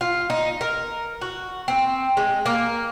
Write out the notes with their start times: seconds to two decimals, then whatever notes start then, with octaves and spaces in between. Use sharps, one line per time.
0.01 F4
0.30 D#4
0.61 A#4
1.22 F#4
1.68 C4
2.17 G#3
2.46 A#3